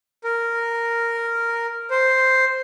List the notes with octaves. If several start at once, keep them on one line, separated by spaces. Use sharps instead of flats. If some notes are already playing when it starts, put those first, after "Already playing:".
A#4
C5